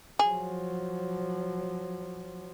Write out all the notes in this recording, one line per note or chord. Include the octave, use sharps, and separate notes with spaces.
F3 F#3 G#4